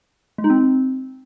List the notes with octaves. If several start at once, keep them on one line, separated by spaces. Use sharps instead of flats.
G#3
D#4
C4